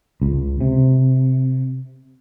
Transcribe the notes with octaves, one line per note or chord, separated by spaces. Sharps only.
C#2
C3